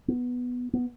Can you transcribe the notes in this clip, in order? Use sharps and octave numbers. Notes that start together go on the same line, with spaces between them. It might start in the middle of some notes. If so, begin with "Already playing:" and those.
B3
B3